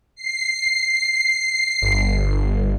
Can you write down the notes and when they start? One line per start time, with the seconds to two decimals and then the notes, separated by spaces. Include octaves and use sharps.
0.16 C7
1.82 G1